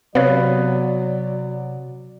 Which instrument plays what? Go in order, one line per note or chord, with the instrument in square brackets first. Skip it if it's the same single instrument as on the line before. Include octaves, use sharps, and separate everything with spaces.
[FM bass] C3 [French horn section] F#3 D5 [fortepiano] B3 [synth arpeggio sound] C#5 F5